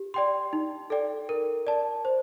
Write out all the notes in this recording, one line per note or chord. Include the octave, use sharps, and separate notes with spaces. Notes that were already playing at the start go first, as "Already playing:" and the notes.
Already playing: G4
D5 G5 C6
D#4
A4 D5 G5
A#4
D5 A5
C5